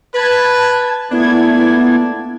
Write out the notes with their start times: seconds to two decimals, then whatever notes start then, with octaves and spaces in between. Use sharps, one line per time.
0.15 B4 A5 G#6
1.11 A#2 A3 B3 D4 E4 G#6